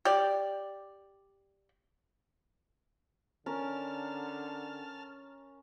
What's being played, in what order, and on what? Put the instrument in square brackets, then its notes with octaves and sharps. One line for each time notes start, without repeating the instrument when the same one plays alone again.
[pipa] G4 D5
[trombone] D3 [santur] C#4 A#4 [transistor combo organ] A5 F6